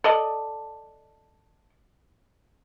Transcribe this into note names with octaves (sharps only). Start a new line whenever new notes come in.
A4 D5 D#5